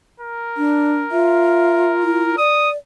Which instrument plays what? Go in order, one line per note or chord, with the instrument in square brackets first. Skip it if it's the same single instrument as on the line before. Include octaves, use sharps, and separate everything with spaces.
[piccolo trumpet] A#4
[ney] D4
[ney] F4 [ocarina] E5
[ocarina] E4
[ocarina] D5 [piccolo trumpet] D#6